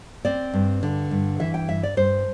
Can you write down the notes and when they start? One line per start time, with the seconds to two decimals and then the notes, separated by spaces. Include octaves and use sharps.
0.25 C4 D5
0.53 G2
0.83 D3
1.11 G2
1.40 E3 E5
1.54 G5
1.69 G2 E5
1.83 D5
1.97 G2 C5